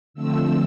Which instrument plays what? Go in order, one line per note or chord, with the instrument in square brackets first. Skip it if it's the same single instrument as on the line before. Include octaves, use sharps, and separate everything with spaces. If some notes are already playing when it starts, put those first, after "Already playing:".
[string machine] D3 F3 A3 C4 E6